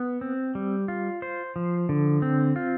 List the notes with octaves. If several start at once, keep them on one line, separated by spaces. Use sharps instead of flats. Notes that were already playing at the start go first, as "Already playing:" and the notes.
Already playing: B3
C4
G3
F4
C5
F3
D3
C4
F4